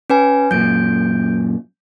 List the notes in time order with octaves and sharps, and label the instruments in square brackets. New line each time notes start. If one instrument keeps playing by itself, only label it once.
[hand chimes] C#4 B4 G#5
[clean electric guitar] F#2 A#2 [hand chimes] G6 D7